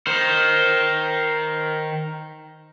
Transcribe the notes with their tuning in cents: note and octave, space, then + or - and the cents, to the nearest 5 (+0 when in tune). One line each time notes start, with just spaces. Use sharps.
D#3 +0 C5 +0